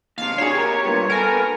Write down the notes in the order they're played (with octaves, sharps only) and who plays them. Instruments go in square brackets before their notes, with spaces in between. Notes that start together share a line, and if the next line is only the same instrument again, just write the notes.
[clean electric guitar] D#2 C3 [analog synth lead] F5
[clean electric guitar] D4 F#4 G#4 [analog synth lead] C#5
[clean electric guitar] G4 A#4
G2 A#2 B3
[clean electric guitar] B3 A4 G#5 [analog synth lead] A#4